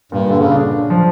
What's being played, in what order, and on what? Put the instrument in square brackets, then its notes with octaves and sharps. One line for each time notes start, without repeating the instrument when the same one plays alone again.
[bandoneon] G2 [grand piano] A#2
[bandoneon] D3
C#3
[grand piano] D4
F3